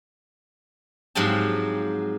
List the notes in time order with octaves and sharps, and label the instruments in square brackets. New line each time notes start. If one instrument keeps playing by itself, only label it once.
[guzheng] G#2 F3 F#3 C4 G4 A5